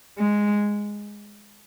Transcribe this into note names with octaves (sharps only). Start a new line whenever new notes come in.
G#3